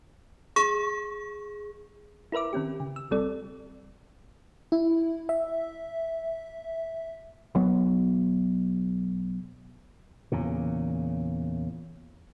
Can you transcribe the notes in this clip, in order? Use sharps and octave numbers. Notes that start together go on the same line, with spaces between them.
G#4 C#6
E4 A#4 B4 E5 D6
D#3 C4 C#4 G4
C#3
E6
B1 G3 C4 A4 D5
E4
E5
B1 F#3 B3
E2 A#2 C#3